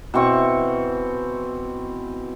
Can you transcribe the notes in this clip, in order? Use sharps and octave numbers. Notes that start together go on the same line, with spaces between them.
B2 E3 C4 C#6